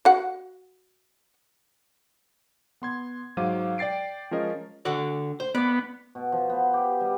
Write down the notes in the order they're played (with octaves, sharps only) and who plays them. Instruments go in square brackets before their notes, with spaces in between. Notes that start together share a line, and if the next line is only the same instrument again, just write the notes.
[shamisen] F#4 F#5
[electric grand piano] B3 C6 G#6
G#2 F#3 C5 F5 D6 D#7
D5 G5 A6 C7 D7
F3 G#3 C#4 A#4 D#5
[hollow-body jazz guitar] D3 F#4 D5
C5
[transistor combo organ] B3 [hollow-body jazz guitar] D5
[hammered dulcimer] B2
F3
B3
G4
G3